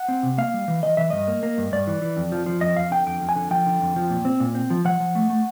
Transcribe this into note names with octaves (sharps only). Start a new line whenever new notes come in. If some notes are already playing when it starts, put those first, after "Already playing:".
Already playing: F#5
C4
C3
A#3 F5
G3
E3
E3 D#5
E3 E5
G2 D#5
A#3
A#3
G2
G2 D5
E3
E3
F2
F3
F3
F2 D#5
F2 F5
D3 G5
F2 G5
F2
G#5
D3
F3 G5
D3
F2
F3
A#2
C4
A#2
C4
F3
F3 F#5
F3
A3
A3